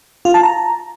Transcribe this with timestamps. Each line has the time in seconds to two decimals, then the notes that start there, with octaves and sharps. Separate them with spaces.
0.25 F4
0.34 A5
0.43 A#5